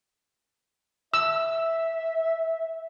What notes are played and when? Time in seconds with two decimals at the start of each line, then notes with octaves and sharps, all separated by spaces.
1.14 E5 E6